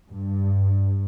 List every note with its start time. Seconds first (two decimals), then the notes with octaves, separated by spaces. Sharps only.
0.10 G2